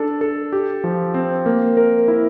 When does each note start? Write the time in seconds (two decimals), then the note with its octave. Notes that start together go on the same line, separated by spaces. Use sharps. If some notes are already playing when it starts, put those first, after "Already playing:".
Already playing: D4 A4
0.21 A4
0.52 G4
0.84 F3
1.14 C4
1.46 A#3
1.77 A#4
2.08 E4